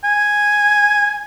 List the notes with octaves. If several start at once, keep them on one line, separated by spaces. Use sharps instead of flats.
G#5